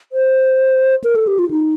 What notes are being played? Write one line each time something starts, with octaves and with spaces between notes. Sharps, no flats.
C5
A#4
A4
G4
F4
D#4